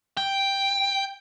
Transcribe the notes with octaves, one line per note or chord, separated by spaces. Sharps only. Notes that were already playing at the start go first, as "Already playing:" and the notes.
G5